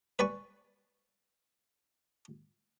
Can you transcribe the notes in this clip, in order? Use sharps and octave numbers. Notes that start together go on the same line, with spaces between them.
B4 D5 G#5 C#6